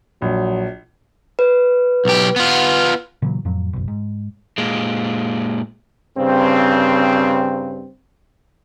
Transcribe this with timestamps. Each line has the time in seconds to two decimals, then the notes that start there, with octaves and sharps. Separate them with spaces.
0.22 A#1 F#3
1.39 B4
2.05 B1 G4
2.36 B3 F4
3.22 A#2 C#3 E3 F#3
3.45 F2 A2 F3 F#3
3.73 F#1 B1
3.88 G#2
4.58 A#2 G#3
6.17 G2 C#3 C4